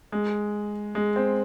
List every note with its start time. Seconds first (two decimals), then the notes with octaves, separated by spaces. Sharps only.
0.12 G#3
0.95 G#3
1.16 C4